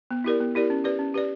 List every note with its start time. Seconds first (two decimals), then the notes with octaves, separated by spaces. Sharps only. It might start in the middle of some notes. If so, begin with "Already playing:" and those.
0.11 B3
0.24 E4 G4 A#4 D5
0.40 B3
0.55 E4 G4 A#4 D5
0.70 C#4
0.84 G4 B4 D5
0.99 C#4
1.14 G4 B4 D5